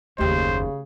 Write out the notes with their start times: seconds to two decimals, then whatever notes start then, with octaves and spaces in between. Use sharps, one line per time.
0.18 F#1 D#2 C#3 A3 G4 C5 G5